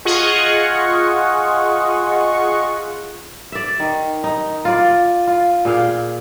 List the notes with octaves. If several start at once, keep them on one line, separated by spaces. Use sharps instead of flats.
F4 G#4 D#5 F#5 C#6
D5 E5
D#3
D#4
F4 D5
F4
A#2 G#4 F5 G5